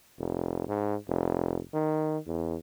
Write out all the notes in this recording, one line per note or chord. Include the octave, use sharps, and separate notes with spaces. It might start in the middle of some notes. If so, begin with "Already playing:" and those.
F1
G#2
F1
D#3
E2